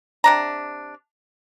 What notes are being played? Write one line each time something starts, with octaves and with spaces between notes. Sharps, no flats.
C3 D4 A#5